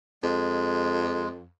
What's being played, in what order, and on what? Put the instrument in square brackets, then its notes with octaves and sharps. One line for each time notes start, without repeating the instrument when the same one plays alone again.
[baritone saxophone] F2 [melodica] G#3